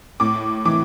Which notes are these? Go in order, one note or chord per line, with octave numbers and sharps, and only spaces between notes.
A2 D6
E3 D6